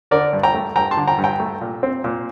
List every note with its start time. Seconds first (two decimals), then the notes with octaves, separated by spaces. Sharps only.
0.11 D3 A#4 D5
0.33 G2
0.43 G5 A#5
0.54 A3
0.75 G2 G5 A#5
0.91 A5 C6
0.97 D3
1.08 G5 A#5
1.18 G2
1.24 G5 A#5
1.40 A3
1.61 A#2
1.83 C4
2.04 A#2